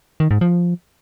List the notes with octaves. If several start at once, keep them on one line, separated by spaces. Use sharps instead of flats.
D#3
G#2
F3